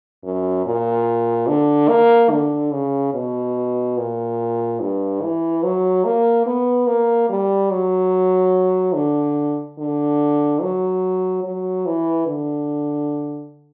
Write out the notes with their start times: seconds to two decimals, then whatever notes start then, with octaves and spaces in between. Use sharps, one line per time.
0.24 F#2
0.66 A#2
1.47 D3
1.89 A#3
2.31 D3
2.72 C#3
3.14 B2
3.97 A#2
4.80 G2
5.22 E3
5.63 F#3
6.05 A#3
6.46 B3
6.87 A#3
7.29 G3
7.71 F#3
8.95 D3
9.79 D3
10.61 F#3
11.44 F#3
11.86 E3
12.27 D3